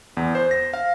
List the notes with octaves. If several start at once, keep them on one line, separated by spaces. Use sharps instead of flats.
E2
C5
A#6
F5